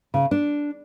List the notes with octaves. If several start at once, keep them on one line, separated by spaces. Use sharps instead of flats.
C#3
D4